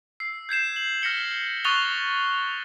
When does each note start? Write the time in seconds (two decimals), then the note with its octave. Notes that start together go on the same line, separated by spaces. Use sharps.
0.20 E6 C7
0.49 G6 G#6 C7 E7
0.76 F#7
1.02 F6 A#6 B6 C#7 G7
1.65 C#6 D#6 F#6 A6 F7 G7